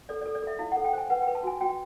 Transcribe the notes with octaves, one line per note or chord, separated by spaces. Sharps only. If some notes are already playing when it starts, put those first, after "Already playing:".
A4 D5
A4 D5
D5
A4 E5
E4 F5
A4 F#5
G5
C5 G#5
B4 F#5
G5
B4
A5
F#4 G#5
F#4 G5